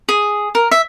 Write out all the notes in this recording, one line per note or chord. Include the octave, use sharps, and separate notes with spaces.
G#4
A#4
E5